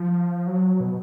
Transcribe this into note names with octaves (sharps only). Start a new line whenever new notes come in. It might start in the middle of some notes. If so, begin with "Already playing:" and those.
Already playing: F3
F#3
B2